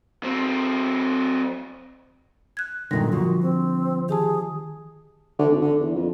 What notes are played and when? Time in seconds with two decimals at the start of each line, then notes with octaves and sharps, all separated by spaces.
0.23 F#3 C4
2.57 F#6 G#6
2.91 F#2 A#2 D3 D#3 G3 A#6
3.13 D3 F3 F#4
3.42 C4
4.09 D#3 G4 G#4 A5
5.39 D3
5.50 G#1
5.62 D3
5.80 E2
5.95 F2